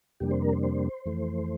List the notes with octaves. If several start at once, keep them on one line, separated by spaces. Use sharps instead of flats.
F2 C3 G3 A#3 D4 G4
C5
A#4
C5
C5
F2 E3 A3